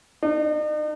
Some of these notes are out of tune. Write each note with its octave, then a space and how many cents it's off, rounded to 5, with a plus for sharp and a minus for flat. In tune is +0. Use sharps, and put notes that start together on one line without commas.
D#4 -45